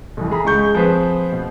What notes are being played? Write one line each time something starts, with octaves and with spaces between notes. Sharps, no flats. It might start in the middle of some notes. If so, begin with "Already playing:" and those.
C2 F2 E3
G#4 A#5 B5
C#2 C#3 G#3 C#6 G6
F3 C4 G#4 B4 C5
B2